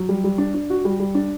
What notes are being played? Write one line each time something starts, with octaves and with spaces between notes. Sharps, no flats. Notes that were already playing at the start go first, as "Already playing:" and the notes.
Already playing: F#3
G3
G3
D4
D4
F#4
G3
G3
D4